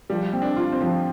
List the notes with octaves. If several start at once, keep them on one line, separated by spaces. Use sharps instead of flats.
F3 G3
C4
D4
F4
C4
F3